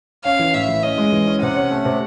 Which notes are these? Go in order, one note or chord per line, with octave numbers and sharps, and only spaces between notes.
C#4 F5
E3
A2 E5
E3
C#4 D#5
G#3
E3
C#4
C3 F#5
C#4
A3
C3